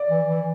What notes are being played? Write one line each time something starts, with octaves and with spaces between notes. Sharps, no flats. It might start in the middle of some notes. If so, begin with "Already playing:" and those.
Already playing: D5
E3
E3